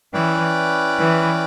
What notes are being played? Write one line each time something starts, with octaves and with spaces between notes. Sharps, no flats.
E3 C#4 E4 B4 D5 G5
E3